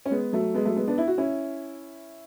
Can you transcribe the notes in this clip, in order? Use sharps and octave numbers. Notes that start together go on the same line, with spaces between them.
C#4
G#3 B3
F#3 A3
G#3 B3
F#3 A3
G#3 B3
B3 D4
E4
F#4
C#4 E4